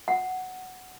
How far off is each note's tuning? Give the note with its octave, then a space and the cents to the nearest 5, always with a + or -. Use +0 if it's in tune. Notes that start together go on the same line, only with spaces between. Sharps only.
F#5 +5